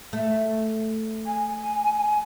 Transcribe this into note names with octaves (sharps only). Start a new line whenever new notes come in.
A3
G#5